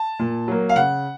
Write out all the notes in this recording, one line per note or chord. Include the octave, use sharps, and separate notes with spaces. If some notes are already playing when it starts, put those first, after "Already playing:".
Already playing: A5
A#2
F#3 A#3
F5
C#3 F#5